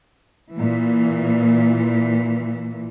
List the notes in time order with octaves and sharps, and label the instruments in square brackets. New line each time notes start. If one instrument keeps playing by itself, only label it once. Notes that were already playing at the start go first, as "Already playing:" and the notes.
[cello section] A#2 E3